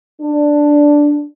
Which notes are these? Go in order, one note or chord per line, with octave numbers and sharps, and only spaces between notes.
D4